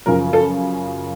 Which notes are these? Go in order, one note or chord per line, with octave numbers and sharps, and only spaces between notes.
F#2 C#3 F3 A#4
A4